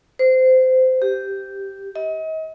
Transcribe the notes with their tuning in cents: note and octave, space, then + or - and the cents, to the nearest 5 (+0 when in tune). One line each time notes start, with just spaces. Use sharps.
C5 -20
G4 -5
D#5 +35